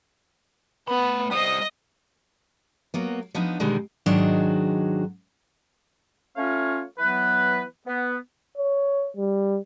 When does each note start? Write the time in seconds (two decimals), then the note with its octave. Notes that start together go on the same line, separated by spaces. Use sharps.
0.88 A3 B3 B5
1.32 G3 C5 D#5 D#6
2.94 F#3 A#3 B3
3.34 F3 B3 D4 D#4
3.60 B2 D3 D#3 G3 G#3 D4
4.06 G#2 D#3 F#3 G#3 D4 F#4
6.36 A3 C#4 F4 C#5 F5
6.98 E3 F#3 B3 B4
7.87 B3
8.57 C#5
9.17 G3